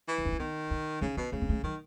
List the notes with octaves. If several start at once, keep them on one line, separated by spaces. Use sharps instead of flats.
E3
E4
D#4
C#4
D#3 B3
D#4
C#3 D#4
B2 C#4
C#3 A3
B3
A3
D#3 F#3